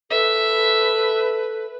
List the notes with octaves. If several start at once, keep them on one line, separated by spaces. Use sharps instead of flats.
A4 B4 E5